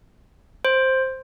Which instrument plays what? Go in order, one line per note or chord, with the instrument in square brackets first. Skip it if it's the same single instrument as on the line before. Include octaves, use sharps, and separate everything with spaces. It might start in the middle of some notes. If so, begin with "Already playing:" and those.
[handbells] C5